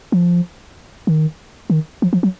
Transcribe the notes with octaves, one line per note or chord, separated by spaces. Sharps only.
F3
D#3
D#3
F3
F3
F#3